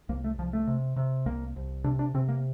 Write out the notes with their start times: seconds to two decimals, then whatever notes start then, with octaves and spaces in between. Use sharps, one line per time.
0.09 C2 A#3
0.24 A3
0.38 C2 F3
0.53 A3
0.67 C3
0.96 C3
1.26 C2 A#3
1.56 C2
1.84 C3 D4
1.99 D4
2.14 C3 C4
2.28 A#3